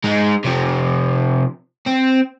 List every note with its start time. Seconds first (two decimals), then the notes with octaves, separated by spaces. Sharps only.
0.04 G#3 D#4
0.45 C3 F3
1.87 C4